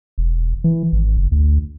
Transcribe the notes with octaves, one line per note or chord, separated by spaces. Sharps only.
E1
E3
G#1
F#1
D2